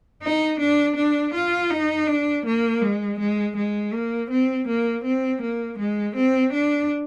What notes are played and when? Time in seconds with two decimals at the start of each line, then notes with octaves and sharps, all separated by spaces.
0.23 D#4
0.60 D4
0.96 D4
1.34 F4
1.70 D#4
2.07 D4
2.46 A#3
2.82 G#3
3.20 G#3
3.56 G#3
3.93 A#3
4.30 C4
4.68 A#3
5.05 C4
5.42 A#3
5.79 G#3
6.16 C4
6.53 D4